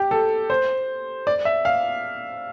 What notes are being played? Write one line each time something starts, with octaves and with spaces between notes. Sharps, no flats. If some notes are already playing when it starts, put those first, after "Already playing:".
Already playing: G4
A4
C5
D5
E5
F5